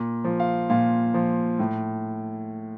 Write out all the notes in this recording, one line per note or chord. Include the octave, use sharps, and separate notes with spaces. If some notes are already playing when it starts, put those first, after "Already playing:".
Already playing: A#2
F3
F5
A#2 F5
F3
A2